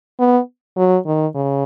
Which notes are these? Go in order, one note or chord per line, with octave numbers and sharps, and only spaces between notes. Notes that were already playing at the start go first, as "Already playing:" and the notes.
B3
F#3
D#3
C#3